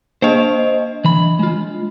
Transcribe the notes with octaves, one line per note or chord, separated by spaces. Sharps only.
A#3 D4 C5 D#5 F5
E3 B5
G#3 F4